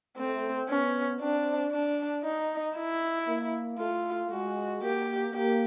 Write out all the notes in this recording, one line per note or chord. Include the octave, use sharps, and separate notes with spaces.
A3 C4
B3 C#4
C4 D4
D4
D#4
E4
A#3
A3 F4
G#3 F#4
A#3 G4
A#3 G4